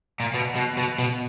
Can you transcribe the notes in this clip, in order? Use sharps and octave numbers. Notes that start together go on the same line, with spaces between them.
A#2
B2
B2
B2
B2